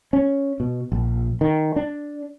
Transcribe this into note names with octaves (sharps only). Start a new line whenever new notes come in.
C#4
B2
A#1
D#3
D4